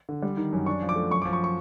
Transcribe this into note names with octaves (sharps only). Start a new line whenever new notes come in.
D3
G3
D#3
F#2
D4 C#6
F3
D6
A3
F#2 C#6
D6
F3
C#6
C#6